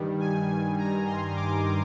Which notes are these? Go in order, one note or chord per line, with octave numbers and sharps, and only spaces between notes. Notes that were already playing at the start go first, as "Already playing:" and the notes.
Already playing: G2 D#3 G3
G#5
G#5
A#5
C6
D6